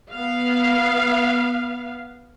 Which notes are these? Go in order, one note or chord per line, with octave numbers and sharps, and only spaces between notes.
B3 F5